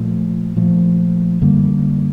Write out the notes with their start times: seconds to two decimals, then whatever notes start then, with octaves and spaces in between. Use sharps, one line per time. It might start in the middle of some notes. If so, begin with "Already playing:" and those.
Already playing: A#2 F3 A3
0.56 A#2 F3 A3
1.42 F#2 D3 G3 A#3